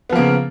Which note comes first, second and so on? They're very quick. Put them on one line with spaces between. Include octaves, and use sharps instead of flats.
B3 F3 A#3 C#3